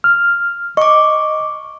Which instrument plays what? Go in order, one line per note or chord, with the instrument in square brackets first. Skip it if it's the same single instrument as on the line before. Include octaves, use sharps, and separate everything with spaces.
[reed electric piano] F6
[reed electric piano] D#5 [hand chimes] C#6 D6